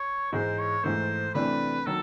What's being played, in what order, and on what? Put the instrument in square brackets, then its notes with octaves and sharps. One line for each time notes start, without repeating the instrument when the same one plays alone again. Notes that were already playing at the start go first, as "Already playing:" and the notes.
Already playing: [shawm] C#5
[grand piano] G#2 E3 G#3 [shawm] C5
[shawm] C#5
[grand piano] G#2 E3 A3 [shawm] C5
[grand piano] C3 E3 A3 D4 [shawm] B4
[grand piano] D#3 F#3 A#3 [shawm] A4